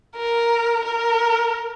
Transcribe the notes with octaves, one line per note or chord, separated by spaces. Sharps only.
A#4
A#4